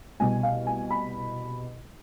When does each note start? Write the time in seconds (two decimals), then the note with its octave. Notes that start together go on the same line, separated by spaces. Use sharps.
0.20 C2 B2 G#5
0.43 F5
0.67 G#5
0.91 B5